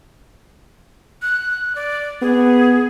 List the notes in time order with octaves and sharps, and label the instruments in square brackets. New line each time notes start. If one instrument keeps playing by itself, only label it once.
[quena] F#6
D5
[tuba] B3 [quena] G#4